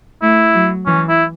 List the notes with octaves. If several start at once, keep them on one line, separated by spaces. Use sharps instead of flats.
A3 E4
F#3
E3 C#4
E4